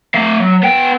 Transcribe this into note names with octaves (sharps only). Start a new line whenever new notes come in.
A3 F5
F#3
B3 G5